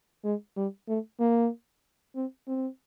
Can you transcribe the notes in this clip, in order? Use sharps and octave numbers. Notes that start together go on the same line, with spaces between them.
G#3
G3
A3
A#3
C4
C4